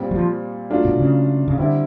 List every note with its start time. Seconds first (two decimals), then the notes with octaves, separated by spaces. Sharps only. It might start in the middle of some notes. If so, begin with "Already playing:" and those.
Already playing: A#2 G3 C4
0.11 F#3
0.16 F3
0.70 F#3 A3 D4 F4
0.85 B2
0.99 C#3
1.48 C#3
1.58 D3 G3 C4 E4